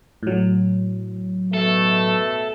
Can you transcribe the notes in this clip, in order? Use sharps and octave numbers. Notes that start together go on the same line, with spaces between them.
A2 F#3
B2 A3 A4